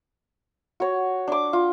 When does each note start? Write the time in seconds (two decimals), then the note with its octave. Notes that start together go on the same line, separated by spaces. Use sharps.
0.80 F#4 C#5
1.28 D4 D6
1.53 F4